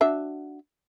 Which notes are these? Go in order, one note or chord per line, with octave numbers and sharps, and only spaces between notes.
D4 F#4 E5